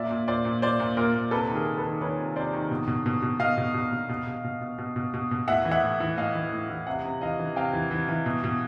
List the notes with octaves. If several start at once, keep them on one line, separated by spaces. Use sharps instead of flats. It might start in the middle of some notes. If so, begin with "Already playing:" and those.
Already playing: A#2 D5 E5
A#2
A#2 C5 D5
A#2
A#2 C5 D5
A#2
A#2 A#4 C5
A#2
C3 A4 B4
D#3
G#4 A#4
C3
A4 B4
D#3
D#3 B4 C#5
C3
C3 C5 D5
D#3
B2
B2
B2
B2
B2 D#5 F5
B2
B2
B2
B2
B2
B2
B2
B2
B2
B2
B2
A2 E5 F#5
E3
E5 F#5
A2
E3
A2 D#5 F5
E3
A2
E3
C3 E5 F#5
C3
E3 D#5 F5
E3
C3 F5 G5
E3
E3
E3
B2
B2